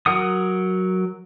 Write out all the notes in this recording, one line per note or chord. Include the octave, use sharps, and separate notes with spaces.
F#3 A#4 F#5 D#6